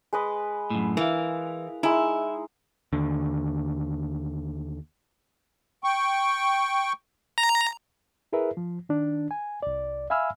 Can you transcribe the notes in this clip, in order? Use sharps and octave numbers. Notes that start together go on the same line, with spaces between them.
G#3 B4 D#5
F#2 A2
E3 A#4 F5
G#3 D#4 E4
D#2 D3
G5 C#6
A#5
E4 G#4 A#4 B4 E5
F3
D#3 D4
G#5
C2 D5
E5 F5 G#5 B5 E6 F6